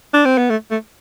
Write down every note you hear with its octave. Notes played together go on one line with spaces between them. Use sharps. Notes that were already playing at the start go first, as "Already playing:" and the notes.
D4
C4
B3
A3
A3